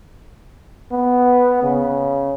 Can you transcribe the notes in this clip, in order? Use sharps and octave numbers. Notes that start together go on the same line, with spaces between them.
B3
C#3